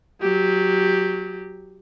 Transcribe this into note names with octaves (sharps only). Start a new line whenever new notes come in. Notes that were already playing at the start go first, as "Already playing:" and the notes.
F#3 G4